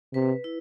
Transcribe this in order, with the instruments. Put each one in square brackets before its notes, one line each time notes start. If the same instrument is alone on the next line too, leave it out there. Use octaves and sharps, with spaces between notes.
[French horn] C3 [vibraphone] B4
[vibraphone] E4